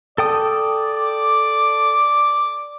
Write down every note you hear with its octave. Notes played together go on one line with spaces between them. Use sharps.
A4 D5 G5 D#6
D6